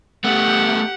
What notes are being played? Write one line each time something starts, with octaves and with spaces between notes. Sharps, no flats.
A3 B3 G4 F#5